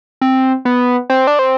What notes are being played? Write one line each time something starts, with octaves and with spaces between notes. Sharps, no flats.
C4
B3
C4
D4
C4